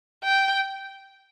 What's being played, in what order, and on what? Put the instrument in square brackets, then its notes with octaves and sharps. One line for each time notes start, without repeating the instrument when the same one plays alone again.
[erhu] G5